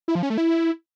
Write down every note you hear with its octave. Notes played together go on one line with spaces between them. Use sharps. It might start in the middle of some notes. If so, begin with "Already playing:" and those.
E4
F3
C#4
A3
E4